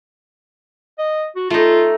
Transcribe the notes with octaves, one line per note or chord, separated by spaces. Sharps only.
D#5
F#4
A3 D#4 F4